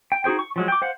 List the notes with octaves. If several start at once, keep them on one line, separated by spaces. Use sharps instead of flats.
G5
D#4 F#4 G#4 C5 G5
C#6
F3 F#3 G#3
G5 D6
C5 F5 F#5